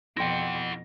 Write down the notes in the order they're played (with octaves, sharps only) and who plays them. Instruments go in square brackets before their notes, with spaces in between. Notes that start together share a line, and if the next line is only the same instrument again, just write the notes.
[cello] F2 B2 [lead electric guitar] E4 F#5 [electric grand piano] G5 C6 A#6